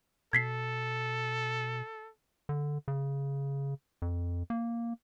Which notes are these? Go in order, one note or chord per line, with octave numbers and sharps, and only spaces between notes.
B2 A4 G#6 B6 C7
D3
C#3
F2
A#3